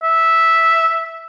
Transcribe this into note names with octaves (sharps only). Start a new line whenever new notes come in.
E5